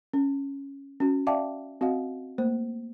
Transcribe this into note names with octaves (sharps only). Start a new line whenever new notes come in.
C#4
C#4 F#4
D5 E5 F5 G5 A5 D6
C4 F#4 D#5 F5 F#5
A3 A#3 C5